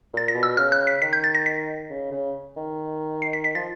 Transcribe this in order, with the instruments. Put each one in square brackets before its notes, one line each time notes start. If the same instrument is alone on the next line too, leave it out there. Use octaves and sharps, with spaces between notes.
[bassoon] A#2 [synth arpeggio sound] A6
[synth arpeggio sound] A#6
[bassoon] B2
[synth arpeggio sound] E6
[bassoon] C#3 [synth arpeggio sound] F6
[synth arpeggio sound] F#6
B6
[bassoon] D#3 [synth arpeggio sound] B6
[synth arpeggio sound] G6
A6
A#6
B6
[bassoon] C#3
C#3
D#3
[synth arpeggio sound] C7
B6
B6
[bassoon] F3 [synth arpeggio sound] A6